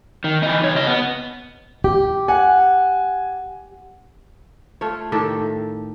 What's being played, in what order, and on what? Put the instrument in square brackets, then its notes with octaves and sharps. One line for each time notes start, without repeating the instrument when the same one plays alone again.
[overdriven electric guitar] D#3
E3 D#4
B1 C#5
C#3 D#5
B3
[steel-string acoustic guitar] G4
[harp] F#5 [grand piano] G#5
[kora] A3 F4 C#5
A2 D#3 G4 A4